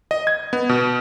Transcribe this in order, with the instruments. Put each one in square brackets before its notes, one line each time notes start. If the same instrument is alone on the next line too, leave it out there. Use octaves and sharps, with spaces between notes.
[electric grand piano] D#5
G#6
B3
B2